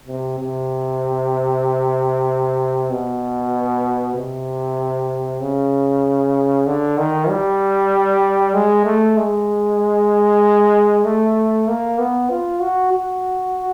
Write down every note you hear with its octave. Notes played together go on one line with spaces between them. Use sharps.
C3
C3
B2
C3
C#3
D3
D#3
G3
G#3
A3
G#3
A3
A#3
B3
F4
F#4
F#4